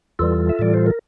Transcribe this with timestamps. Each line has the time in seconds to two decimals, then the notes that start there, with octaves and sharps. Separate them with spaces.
0.19 E2 E3 G3 F4 A4
0.49 E5
0.59 A2 E3 G3 D5
0.74 C5
0.86 A#4